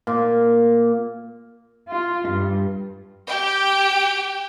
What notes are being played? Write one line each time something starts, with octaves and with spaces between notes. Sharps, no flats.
A#2
F4
G2
G4 G5